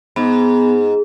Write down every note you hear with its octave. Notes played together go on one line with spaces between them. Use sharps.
G#2 B3